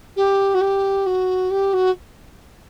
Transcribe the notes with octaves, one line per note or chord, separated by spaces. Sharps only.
G4
F#4
G4
F#4
G4
F#4